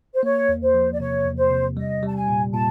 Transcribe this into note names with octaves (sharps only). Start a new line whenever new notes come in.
C5
A#3 C#5
E2
C5
F3
D5
C3 C#5
E2
C5
C3
G3 D#5
G3
A5
G#5
A#2
A#2 A5